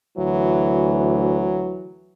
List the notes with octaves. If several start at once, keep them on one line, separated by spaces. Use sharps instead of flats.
D2 E3 F#3